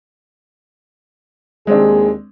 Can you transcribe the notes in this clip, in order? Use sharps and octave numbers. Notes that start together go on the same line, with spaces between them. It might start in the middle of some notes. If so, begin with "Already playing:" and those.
D#2 G#3 C4 D4 G#4